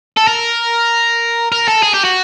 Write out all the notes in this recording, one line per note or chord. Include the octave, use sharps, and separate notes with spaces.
A4
A#4
A#4
A4
G#4
G4
F#4